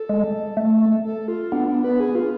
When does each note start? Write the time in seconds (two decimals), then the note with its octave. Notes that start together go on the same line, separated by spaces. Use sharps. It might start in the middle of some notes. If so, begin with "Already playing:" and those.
Already playing: A4
0.09 G#3
0.57 A3
1.04 A4
1.28 F4
1.52 B3 D4
1.68 D4
1.84 B4
2.00 G#4
2.15 F4